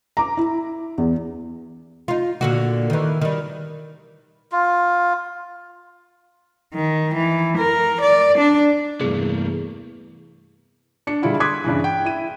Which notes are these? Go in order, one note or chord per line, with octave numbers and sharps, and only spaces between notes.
A#5 D6
E4
E2
D#4 F4
A#2 D3 F#4
D#3 E3
D#3 G3
F4
D#3
E3
A#4
D5
D4
E2 G2 C3 A3 A#3 G#4
D4 C#7
D3 G3 G#3 D4 E4 F4
C6 D6 D#6 F#6 G#6 B6
G2 C#3 E3
G5
E4 D#7